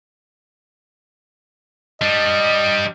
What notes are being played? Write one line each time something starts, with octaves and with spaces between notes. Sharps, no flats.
G3 D4 D#5